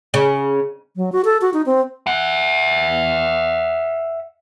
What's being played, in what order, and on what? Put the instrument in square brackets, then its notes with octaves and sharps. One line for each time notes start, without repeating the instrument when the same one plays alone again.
[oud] C#3
[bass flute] F#3
F#4
A4
F#4
D#4
C4
[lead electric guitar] E5 F#5